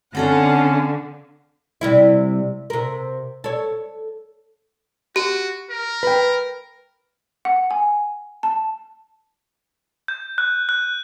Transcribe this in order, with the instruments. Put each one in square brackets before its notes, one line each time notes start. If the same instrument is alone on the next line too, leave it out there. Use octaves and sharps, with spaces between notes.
[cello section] D3 [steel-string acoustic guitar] C4 A4 D5 [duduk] C#4 [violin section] F5 F#5
[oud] C3 G3 E4
C3 A#4
A4 C#5
[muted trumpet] F#4 [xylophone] G4
[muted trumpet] A#4
[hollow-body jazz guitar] B4 G5
[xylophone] F#5
G#5
A5
[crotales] G6
F#6
F#6